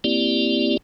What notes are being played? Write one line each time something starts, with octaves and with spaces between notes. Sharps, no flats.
A#3 C4 E4 G4 D5